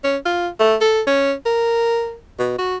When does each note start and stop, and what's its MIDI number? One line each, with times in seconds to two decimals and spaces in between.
0.04 0.17 61
0.26 0.48 65
0.60 0.76 57
0.81 1.02 69
1.07 1.34 61
1.46 2.16 70
2.39 2.55 47
2.58 2.77 66